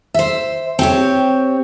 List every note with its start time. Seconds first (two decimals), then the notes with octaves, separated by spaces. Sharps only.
0.14 C5 E5
0.79 C4 G4 C#5